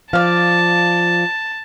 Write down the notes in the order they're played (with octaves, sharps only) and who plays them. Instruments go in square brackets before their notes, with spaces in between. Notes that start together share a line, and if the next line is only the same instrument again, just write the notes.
[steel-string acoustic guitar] F3 [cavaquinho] D5 F5 [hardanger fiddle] A5